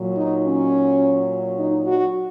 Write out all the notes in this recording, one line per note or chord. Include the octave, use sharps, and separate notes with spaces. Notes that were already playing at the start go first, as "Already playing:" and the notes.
Already playing: A#2 F#3
D#4
C#4
D#4
F#4